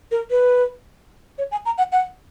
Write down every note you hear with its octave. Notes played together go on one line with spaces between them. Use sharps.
A#4
B4
C#5
G#5
A#5
F#5
F#5